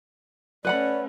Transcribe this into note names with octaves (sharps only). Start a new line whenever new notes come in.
A3 C#4 B4 D5 F#5 B5